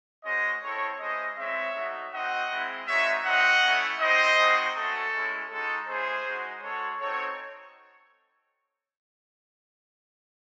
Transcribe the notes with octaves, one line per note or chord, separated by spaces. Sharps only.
G#3 C#4 F#4 C5 D#5
C4 E4 A4 C#5
G#3 C#4 E4 C5 D#5
G#3 C4 E4 C#5 E5
A3 D#4 F#4
C4 D#4 F#4 D#5 F#5
G#3 C4 E4
G#3 C4 D#4 F#4 C#5 E5
C4 D#4 F#4 D#5 F#5
A3 C#4 E4
C4 E4 C5 D#5
G#3 C4 D#4 F#4
A3 C#4 F#4 A4
G#3 C#4 E4
G#3 D#4 F#4 A4
G#3 C#4 E4 G#4 C5
G#3 D#4 F#4
G#3 C#4 F#4 A4 C#5
C4 D#4 F#4 A4 C#5